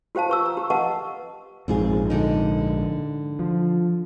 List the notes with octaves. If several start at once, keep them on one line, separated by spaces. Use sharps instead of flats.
F4 G4 C5 F5 A5
B4 C#6 E6
A#5
G4
B4 D#5 F5 F#5 A5 C#6
A#1 G#2 C4 F4 G#4
D3 D#4
F3